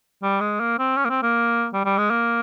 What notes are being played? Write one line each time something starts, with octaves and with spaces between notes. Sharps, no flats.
G3
G#3
A#3
C4
C#4
A#3
C4
A#3
G3
G3
G#3
A#3